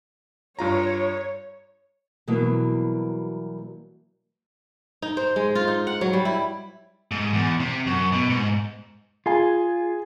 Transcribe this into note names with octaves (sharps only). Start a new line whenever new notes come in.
G2 F4 C#5 A#5
B2 E3 F#3 G3 A#3
D#4
C5
G#3
F4
D#4
F#5
F#3
G3
E4
G#2
E2
C3
F#2
B2
G#2
F4 G#4 G#5